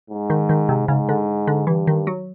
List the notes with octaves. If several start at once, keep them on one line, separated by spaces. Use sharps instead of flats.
G#2
D#3
D#3
C3
G#2 C#3
D3
D3
G2 E3
D#3
F#3